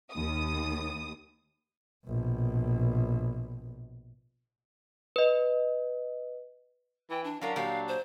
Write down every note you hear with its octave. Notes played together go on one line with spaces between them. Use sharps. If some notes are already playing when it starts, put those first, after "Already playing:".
D#2 D#6
A#1 B2
B4 D#5
E3 G5
D4
F#3 C#4 D4 A#4 F5
A#2 F#3 G4 F5
C5